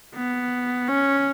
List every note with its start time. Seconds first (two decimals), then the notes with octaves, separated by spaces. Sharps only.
0.15 B3
0.88 C#4